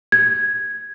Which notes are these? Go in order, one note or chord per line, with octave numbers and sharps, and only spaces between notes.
G#6